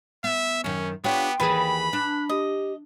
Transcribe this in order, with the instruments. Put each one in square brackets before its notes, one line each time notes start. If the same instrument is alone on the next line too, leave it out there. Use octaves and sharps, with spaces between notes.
[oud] B3 [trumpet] E5
[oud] F#2 D#3 [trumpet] C#4
[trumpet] B3 [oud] D4 F4 C#5 [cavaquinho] G4 [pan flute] G5
[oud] D#2 E3 G#4 [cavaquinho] B4 G#5 A5 [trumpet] B5
[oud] D4 [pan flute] F#6
[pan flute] G4 [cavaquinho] D#5